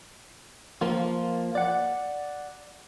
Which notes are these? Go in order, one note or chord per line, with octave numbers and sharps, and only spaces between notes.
F3 A#3 F4
D5 F#5